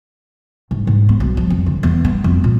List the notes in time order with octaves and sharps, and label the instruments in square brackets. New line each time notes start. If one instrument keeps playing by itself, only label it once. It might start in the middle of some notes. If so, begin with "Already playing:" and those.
[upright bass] G#2
G#2
B3
B1
F3
F2
D3
E2
B3
F2
A#2